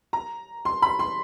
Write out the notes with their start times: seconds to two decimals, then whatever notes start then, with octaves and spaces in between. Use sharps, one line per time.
0.13 A#5
0.65 C6
0.82 B5
0.99 C6